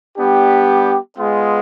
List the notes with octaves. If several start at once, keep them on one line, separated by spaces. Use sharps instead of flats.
G3 B3 D4 G4
G#3 B3 F4 G#4